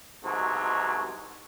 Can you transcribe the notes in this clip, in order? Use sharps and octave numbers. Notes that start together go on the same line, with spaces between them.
C2 G#2 B2 F#3